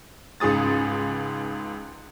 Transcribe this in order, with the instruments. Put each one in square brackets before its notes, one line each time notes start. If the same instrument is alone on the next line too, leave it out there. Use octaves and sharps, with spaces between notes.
[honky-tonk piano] C#2 G#2 G#4 D#6 A6